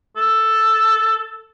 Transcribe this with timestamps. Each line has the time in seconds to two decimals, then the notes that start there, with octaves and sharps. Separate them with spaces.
0.17 A4